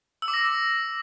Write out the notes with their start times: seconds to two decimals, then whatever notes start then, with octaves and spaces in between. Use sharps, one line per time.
0.22 E6
0.28 D6
0.34 A#6